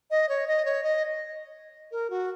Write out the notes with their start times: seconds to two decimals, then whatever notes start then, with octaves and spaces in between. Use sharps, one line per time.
0.11 D#5
0.29 C#5
0.47 D#5
0.65 C#5
0.84 D#5
1.92 A#4
2.10 F#4